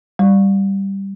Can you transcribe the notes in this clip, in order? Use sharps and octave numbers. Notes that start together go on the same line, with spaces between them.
G3